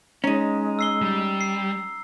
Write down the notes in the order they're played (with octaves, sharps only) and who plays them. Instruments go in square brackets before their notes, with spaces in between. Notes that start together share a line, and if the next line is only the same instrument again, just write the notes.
[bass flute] G#3 [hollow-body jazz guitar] C#4 D#4 [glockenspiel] A#5
[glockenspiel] E6 C7 G7
[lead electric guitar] G3
[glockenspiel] C7